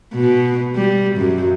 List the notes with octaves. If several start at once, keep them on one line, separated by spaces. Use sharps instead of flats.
B2
G3
F#2